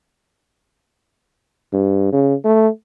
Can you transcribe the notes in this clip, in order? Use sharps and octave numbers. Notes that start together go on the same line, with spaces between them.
G2
C#3
A3